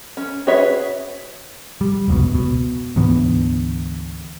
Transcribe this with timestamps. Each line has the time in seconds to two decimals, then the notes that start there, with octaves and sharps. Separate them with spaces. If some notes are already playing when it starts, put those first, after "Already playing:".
0.17 C#4
0.47 F#4 G#4 B4 C#5 E5
1.81 G3
2.08 F1 C#2 B2
2.35 B2
2.96 D2 G#2 E3 B3